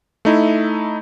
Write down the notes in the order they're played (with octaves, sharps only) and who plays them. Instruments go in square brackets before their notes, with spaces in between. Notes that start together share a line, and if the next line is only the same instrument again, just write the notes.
[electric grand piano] A3 D#4 E4